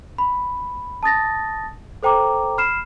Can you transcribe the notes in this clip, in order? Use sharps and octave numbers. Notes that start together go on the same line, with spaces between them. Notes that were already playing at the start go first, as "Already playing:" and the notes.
B5
A5 D#6 A6 A#6
A4 C5 G5 A#5 D6
B5 F6 C7 E7